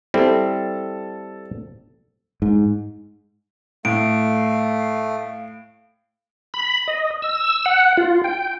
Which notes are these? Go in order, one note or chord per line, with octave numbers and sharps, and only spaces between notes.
G3 C4 E4 A4
G#2
A2 A3 F5 D7
B5
D#5
E6
F#5
F4
G5